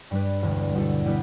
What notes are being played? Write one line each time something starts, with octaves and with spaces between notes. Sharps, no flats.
G2 G3 D4 B4
E1 D2 D3
B2 G3 E4 A4
B2 G3 B3 E4